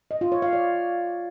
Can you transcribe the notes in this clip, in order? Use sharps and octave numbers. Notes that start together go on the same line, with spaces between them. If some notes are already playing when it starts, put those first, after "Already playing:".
D#5
F4
C#5
F5
D5